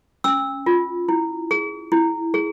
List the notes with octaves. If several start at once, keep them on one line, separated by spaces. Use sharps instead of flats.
C#4 E6
F4
E4
G#4
E4
G#4